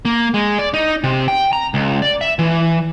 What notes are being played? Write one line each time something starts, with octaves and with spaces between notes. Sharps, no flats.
A#3
G#3
D5
D#4
C3
G5
A#5
C#2
D5
E5
E3